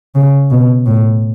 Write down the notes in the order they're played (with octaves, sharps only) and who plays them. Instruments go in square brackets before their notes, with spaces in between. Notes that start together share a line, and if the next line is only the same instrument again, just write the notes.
[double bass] C#3
B2
A2